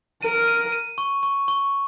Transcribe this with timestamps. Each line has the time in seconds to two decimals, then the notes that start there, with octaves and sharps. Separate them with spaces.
0.22 A#4 D#7
0.48 D#7
0.72 D#7
0.98 C#6
1.23 C#6
1.48 C#6